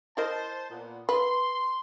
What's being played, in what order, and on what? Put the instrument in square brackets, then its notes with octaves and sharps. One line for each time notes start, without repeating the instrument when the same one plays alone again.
[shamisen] E4 A#4 D#5 [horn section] C5 A5
[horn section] A#2 B3
[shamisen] B4 [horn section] C6